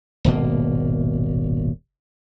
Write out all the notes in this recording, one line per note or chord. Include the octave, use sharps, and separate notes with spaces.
D#1 G#1 B2 A#3